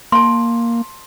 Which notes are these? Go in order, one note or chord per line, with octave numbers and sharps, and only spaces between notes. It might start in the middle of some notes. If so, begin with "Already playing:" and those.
A#3 A5 C6